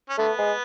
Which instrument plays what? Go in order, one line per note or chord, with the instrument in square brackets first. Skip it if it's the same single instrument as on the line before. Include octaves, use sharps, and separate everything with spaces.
[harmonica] C#4
[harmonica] D3 B3 [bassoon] A3
[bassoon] G#3